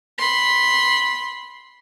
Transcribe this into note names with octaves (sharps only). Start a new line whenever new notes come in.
B5 C6